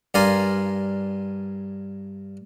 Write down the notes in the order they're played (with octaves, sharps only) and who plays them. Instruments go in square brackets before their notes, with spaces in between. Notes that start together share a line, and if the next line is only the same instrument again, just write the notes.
[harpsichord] G2 A#4 D5 F5 G#5 C6